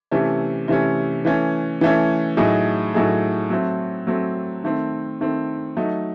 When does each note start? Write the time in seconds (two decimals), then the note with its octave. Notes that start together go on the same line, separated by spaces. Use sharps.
0.11 C3 E3 A3 C#4
0.68 C3 E3 A3 C#4
1.25 E3 A3 C#4
1.81 E3 A3 C#4
2.37 A2 F#3 A3 D#4 G#4
2.94 A2 F#3 A3 D#4 G#4
3.50 F#3 A3 C4
4.07 F#3 A3 C4
4.64 D#3 A3 C4
5.21 D#3 A3 C4
5.77 F#3 A3 D#4